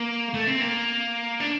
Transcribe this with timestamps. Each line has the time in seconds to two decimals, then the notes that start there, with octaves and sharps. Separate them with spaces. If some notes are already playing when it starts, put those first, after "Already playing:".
Already playing: A#3
0.34 A3
0.47 C4
0.61 A#3
1.40 D4